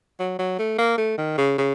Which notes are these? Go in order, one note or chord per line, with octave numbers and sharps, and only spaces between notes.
F#3
F#3
A3
A#3
A3
D#3
C#3
C#3